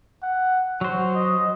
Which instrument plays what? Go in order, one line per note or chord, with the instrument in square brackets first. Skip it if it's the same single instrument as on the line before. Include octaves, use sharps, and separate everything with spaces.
[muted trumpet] F#5
[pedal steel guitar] F#3 C5 [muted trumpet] F#4
[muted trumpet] D#5